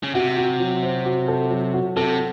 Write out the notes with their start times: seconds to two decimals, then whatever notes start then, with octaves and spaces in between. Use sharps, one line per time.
0.03 C#3
0.15 C3 F#4
0.37 F#4
0.60 F#3
0.83 C4
1.05 F#4
1.28 A4
1.50 F#3
1.74 F#4
1.96 C3 A4